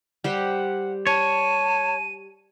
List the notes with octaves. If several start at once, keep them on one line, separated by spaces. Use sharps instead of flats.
G3 G4 C5 F#5
C#5 A5 D#7